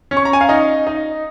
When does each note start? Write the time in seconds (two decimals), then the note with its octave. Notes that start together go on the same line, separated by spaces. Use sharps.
0.11 C#4
0.17 C#6
0.25 A#5
0.33 G#5
0.41 F5
0.49 D#4 D#5
0.87 D#4